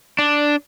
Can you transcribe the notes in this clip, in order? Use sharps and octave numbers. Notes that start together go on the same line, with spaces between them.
D4